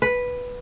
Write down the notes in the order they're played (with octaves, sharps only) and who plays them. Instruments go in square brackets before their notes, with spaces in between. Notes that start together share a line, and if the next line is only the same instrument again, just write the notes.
[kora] B4